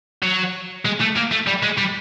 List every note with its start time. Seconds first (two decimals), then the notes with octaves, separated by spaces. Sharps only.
0.23 F#3
0.85 G#3
1.00 A3
1.16 A#3
1.32 A3
1.47 G3
1.63 G#3
1.78 G3